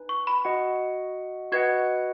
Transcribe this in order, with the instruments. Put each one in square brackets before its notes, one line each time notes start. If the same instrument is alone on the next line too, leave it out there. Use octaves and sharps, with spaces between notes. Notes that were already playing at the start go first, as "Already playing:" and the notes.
Already playing: [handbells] D#4 B4 G#5
[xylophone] C#6
B5
[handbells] F#4 D#5 F#5
[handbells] F#4 B4 D#5 F#5 [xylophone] G#6